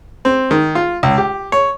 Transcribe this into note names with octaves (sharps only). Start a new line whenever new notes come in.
C4
D#3
F4
C#2
G4
C#5